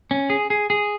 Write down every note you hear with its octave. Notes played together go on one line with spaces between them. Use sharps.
C#4
G#4
G#4
G#4